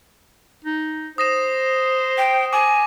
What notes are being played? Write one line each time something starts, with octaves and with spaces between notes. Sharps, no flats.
D#4
C5 D#6 A#6 E7
G5
G#5 D6